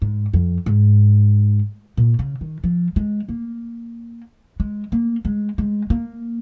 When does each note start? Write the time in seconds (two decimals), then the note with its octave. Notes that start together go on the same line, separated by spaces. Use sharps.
0.02 G#2
0.33 F2
0.66 G#2
1.97 A#2
2.19 C#3
2.41 D#3
2.64 F3
2.96 G#3
3.29 A#3
4.60 G#3
4.92 A#3
5.25 G#3
5.58 G#3
5.90 A#3